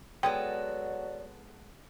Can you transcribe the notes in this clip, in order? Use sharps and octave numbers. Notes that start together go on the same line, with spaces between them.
F#3 G#3 B3 A4 D5 G5